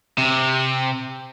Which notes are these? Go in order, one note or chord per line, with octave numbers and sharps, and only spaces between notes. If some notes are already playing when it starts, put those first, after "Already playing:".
C3